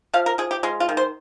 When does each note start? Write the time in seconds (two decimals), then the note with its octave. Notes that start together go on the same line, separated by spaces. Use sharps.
0.14 F3 F5
0.26 A#4
0.38 F3 G#4
0.51 G4
0.63 G#3 F4
0.80 F4
0.89 D#3
0.97 C5